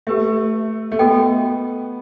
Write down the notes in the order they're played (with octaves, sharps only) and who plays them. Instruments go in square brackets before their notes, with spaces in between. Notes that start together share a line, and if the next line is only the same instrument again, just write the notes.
[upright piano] A3 [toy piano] G4 B4 E5
[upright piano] A3
[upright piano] B3 [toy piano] F#4 A4 D#5 G5